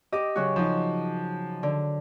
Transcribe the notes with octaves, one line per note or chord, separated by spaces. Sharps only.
G4 D#5 D6
C#3 F#3 F#4
F3 D#4
D3